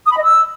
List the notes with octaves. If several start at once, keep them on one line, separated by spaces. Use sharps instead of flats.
D#6
B5
D#5
E6